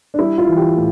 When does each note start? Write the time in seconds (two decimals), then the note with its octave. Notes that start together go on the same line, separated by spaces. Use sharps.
0.14 D4
0.19 G3 E4
0.38 F4
0.47 E3
0.57 G4
0.77 A2